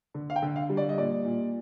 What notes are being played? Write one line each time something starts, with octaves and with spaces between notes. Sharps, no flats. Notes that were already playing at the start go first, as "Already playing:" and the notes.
D3
F5
G5
D3
F5
G3
D5
D#5
A#2 D5
A#2